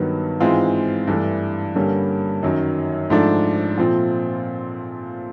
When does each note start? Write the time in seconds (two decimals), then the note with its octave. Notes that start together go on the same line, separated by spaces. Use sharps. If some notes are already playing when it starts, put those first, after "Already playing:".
Already playing: G2 D#3 F#3 B3
0.40 G#2 E3 G#3 C4 F4
1.07 G2 E3 A3 D4
1.75 G2 D3 G3 A#3 C#4
2.43 F#2 D#3 F#3
3.10 G#2 F3 A3 D4
3.78 A#2 F3 A3 C4 F4